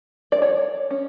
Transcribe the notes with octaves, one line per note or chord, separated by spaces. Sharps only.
D5
C#5
C#4